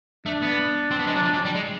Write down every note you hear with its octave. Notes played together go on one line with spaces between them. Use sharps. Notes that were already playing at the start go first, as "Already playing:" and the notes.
A3 D4
B3
C4
B3
G#3
F#3
F3
F#3
G3
G#3